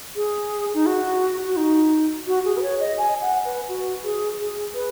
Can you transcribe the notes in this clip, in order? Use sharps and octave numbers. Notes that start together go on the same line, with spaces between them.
G#4
D#4
F#4
F#4
D#4
F#4
G#4
B4
C#5
D#5
G#5
F#5
B4
F#4
G#4
G#4
B4